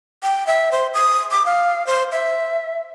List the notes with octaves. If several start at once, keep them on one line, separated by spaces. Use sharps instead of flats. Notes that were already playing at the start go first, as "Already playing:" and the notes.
G5
E5
C5
D#6
D6
F5
C5
E5